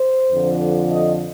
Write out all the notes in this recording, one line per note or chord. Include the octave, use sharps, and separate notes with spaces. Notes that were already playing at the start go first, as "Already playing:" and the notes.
Already playing: C5
F2 D3 F3
D#5